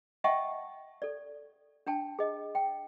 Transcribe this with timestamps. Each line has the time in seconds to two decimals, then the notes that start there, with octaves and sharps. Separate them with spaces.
0.24 D#5 E5 F#5 G5 A5 C#6
1.02 A4 D5
1.87 D4 G5 A5
2.19 G#4 D#5
2.55 G5